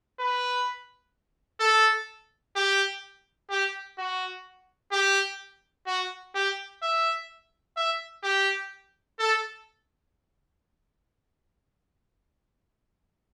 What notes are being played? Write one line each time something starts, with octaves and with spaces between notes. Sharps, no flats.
B4
A4
G4
G4
F#4
G4
F#4
G4
E5
E5
G4
A4